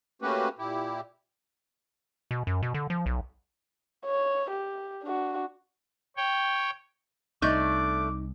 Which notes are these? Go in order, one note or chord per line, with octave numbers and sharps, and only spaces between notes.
A3 A#3 C#4 F#4 G4 B4
A#2 E4 G4
B2
F#2
B2
D3
F3
B1
C#5
G4
D4 F#4
C#5 G5
C2 A3 D4 D#4 D6 G6